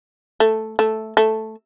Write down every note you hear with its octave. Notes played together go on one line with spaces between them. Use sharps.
A3
A3
A3